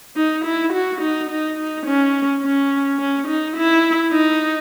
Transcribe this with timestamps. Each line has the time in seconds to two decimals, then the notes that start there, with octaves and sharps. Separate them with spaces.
0.16 D#4
0.45 E4
0.73 F#4
1.01 D#4
1.30 D#4
1.58 D#4
1.86 C#4
2.43 C#4
2.99 C#4
3.28 D#4
3.56 E4
4.12 D#4